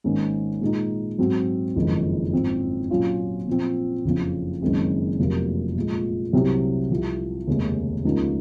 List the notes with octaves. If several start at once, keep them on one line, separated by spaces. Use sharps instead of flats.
G#1 G#2 D#3 A#3 C#4
A#2 G#3 D#4
G#2 F#3 C4 F#4
F#1 F2 D#3 G#3
G#2 F3 C4
A#2 F#3 C#4 F4
A#2 F3 C4
F#1 F2 C#3 F3 C4
F#1 F#2 D#3 G#3 C4
F1 F2 C3 F#3 A#3
A#2 F3 G#3
C2 C3 F#3
C2 C3 F3
F1 D#2 C#3 G#3 C#4
C#2 C#3 F3 A#3 D#4